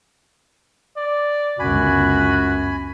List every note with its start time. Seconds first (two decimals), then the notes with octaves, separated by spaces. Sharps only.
0.96 D5
1.59 G1 C#2 F#2 F#4 G#5 B5